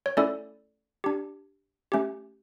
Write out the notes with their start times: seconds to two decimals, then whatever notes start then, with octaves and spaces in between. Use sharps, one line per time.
0.06 C#5
0.17 A3 C#4 E4 A4 D5
1.04 D4 G4
1.92 A3 C#4 G4